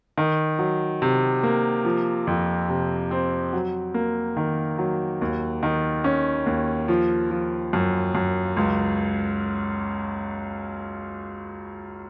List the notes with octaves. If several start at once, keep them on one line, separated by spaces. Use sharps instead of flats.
D#3
F#3
C3
A#3
F3
F2
C3
C4
F#3
A#3
D#3
F#3
D#2
D#3
C#4
D#2
F3
F3
F#2
F#2
C#2